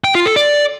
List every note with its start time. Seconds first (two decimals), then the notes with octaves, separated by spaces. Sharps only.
0.04 G5
0.15 F4
0.26 A4
0.36 D5